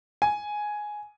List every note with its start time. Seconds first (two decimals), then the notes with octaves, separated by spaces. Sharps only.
0.22 G#5